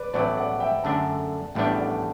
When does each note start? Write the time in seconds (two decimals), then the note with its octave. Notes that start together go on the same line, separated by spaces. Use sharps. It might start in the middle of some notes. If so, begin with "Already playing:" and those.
Already playing: B4 D5
0.13 A1 A2 F#3 B3 E4 B4 D5
0.37 D5 F#5
0.60 E5 G5
0.84 F#2 D3 A3 D4 F#5 A5
1.55 A1 A2 G3 B3 D4 E5 G5
1.79 D5 F#5